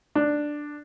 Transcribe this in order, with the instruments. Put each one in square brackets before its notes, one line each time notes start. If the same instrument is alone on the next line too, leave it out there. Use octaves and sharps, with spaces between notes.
[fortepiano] D4